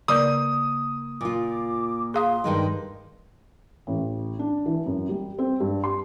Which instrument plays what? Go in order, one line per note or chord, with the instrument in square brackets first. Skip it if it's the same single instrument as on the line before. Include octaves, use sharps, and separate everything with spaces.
[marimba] C#3 D5 G6 [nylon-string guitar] A#3 [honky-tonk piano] D#6
[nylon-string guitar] A#2 F4 [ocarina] D6
[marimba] G#4 F5 D#6 [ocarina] C6
[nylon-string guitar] G2 D#3 G#3
[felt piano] A1
D4
E3
F#2
G3
C4
G2
C6